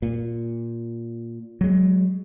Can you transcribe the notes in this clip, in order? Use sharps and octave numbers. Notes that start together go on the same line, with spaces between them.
A#2
F#3 G#3